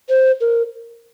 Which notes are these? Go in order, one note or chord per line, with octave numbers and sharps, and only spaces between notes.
C5
A#4